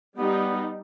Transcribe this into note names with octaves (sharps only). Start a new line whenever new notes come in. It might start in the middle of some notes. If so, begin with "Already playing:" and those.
G3 B3 D#4